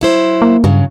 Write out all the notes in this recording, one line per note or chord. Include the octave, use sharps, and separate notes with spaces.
F#3 E4 C5
A#3
G2 C#3 F#3